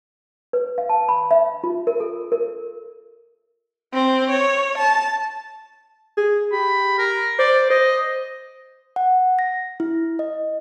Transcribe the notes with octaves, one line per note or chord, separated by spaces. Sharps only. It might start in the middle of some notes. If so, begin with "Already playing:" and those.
B4
F5
A5
B5
E5
F4
A#4
A4
A#4
C4 C5
C#5
A5
G#4
G4 B5
A#4
C5 D5
C5 D#5
F#5
A#6
E4
D#5